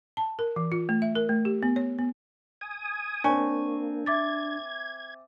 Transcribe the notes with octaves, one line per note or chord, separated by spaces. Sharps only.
A5
A#4
E3
F4
A3
E5
A#4
A3
G4
B3
C#5
B3
G#5 D#6
A#3 C4 D4 C#5 G#5 C#6
E5 D6 G#6 A6